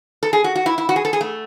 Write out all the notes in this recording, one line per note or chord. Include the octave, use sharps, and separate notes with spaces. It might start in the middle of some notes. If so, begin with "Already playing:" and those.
A4
G#4
F#4
F#4
E4
E4
F#4
G#4
A4
G#4
A3